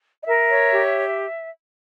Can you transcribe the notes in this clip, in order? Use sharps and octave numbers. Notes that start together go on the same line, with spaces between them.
D#5
A#4 E5
C#5
G4